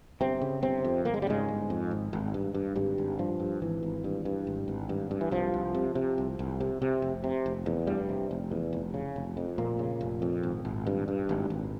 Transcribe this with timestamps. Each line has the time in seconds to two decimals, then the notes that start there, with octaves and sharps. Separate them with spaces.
0.21 G1 C3 C4
0.41 C#3
0.62 G1 C3 C4
0.85 F2
1.05 G1 A#3
1.14 G#3
1.22 G3
1.27 G#2 C#3 G#3
1.49 G1
1.70 F2
1.91 G#1
2.13 G#1
2.34 G2
2.54 G2
2.76 G#1 G2 G3
2.98 G#1
3.19 G2 F3
3.40 G2
3.62 G#1 E3
3.83 G#1
4.04 G2
4.25 G2
4.47 G#1
4.68 G#1
4.89 G2
5.11 G2
5.21 E3
5.31 C2 F3
5.54 C2
5.74 C3
5.95 C3
6.18 C2
6.39 C2
6.61 C3
6.82 C3
7.02 F1
7.24 C3
7.46 F1
7.66 E2
7.87 F1 G2 G3
8.09 C3
8.31 F1
8.51 E2
8.73 F1
8.94 C#3
9.16 F1
9.37 F2
9.58 F1 A#2 A#3
9.79 C#3
10.01 F1
10.22 F2
10.43 G#1
10.65 G#1
10.87 G2
11.08 G2
11.29 G#1
11.50 G#1